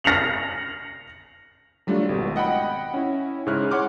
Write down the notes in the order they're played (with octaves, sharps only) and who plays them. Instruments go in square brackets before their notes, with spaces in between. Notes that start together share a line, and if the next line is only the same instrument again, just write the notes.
[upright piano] F6 A#6 C7 C#7 F7 F#7
[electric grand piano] F#3 G3 A3 D4 F4
G#1 B2
D#5 F#5 G5 B5
C#4 E4
G#2 C#3 E4 C#5 F6 F#6
C#5 F#5 C6 D6 F6